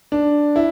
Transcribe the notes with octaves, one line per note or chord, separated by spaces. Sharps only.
D4
E4